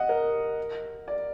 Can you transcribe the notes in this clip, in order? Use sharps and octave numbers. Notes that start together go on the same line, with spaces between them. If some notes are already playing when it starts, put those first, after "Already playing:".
Already playing: D#5 F#5
A#4
D5